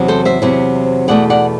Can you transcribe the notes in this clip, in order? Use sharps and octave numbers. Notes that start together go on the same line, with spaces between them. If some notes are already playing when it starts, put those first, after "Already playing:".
Already playing: E2 C3 F#3
A4 C5
C5 E5
E2 C3 F#3
E2 B2 A3 D5 F#5
D5 F#5